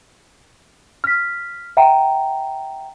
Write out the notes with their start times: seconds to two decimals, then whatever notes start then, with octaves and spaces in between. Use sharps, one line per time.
1.04 F6 B6
1.77 E5 F#5 G5 A#5